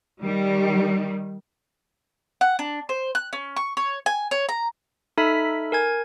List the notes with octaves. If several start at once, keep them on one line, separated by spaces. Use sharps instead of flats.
D#3 G3
F#5
D4
C5
F#6
C#4
C#6
C#5
G#5
C#5
A#5
D#4 A4 E5 B5 F6 B6
A#4 G#5 G#6